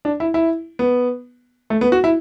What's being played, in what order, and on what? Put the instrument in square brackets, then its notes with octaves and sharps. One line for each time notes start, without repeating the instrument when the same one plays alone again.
[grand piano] D4
E4
E4
B3
A3
B3
F#4
E4